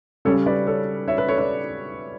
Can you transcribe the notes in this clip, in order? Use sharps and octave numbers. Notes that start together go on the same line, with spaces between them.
C#3 G3 C#4 A4 C#5
B4 D5
A4 C#5
C#5 E5
B4
A4 C#5
B4 D5